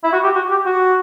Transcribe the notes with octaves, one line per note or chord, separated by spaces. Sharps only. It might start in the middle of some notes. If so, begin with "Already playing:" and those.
E4
F#4
G4
F#4
G4
F#4